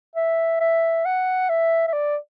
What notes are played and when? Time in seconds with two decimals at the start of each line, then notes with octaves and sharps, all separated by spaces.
0.16 E5
0.60 E5
1.05 F#5
1.49 E5
1.88 E5
1.93 D5